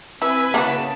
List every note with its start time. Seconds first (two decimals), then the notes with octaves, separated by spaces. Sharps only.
0.22 C4 E4 B4 G#5 E6
0.54 C#3 A#3 E4 F#4 A5